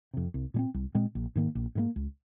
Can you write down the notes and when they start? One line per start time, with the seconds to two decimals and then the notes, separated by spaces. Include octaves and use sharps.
0.14 F2 C3
0.34 C2
0.54 A#2 G#3 C4
0.74 C2
0.95 A#2 G#3 C4
1.15 A#1
1.36 G#2 D#3 A#3
1.55 A#1
1.75 G#2 D#3 A#3
1.96 C#2